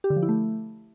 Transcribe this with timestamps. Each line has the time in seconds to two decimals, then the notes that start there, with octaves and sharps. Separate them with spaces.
0.04 G4
0.10 D3
0.16 F3
0.23 E4
0.29 A3